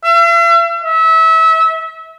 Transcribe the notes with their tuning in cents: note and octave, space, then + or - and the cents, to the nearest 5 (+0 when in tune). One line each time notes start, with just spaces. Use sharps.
E5 +45
E5 -25